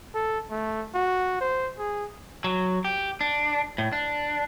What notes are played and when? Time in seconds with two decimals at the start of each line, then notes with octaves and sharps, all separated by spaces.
0.14 A4
0.50 A3
0.94 F#4
1.40 C5
1.78 G#4
2.44 F#3
2.85 G4
3.21 D4
3.78 A2
3.92 D4